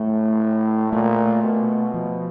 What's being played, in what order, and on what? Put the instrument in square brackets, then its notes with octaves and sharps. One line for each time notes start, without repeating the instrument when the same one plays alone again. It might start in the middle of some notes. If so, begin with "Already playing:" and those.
Already playing: [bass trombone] A2 [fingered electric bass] A3
[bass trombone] A#2 [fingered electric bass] A3
[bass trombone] B2
[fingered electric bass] F3